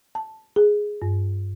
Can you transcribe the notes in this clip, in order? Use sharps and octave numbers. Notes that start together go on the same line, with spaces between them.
A5
G#4
G2